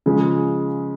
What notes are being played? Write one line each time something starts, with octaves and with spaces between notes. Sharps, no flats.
C#3 F3 G#3